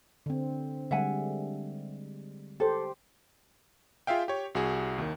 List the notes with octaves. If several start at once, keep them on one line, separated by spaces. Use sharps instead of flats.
D3 C4
D3 G3 G#3 E5 F#5 G#5
G4 A4 C5
F4 G#4 E5 F5 G5
G4 C#5
C2 F#4 G#4
D#2 D#3